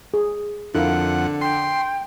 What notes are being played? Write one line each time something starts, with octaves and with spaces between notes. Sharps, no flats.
G#4
F2 D3 E4 A#4 F5 F#5
G5 C6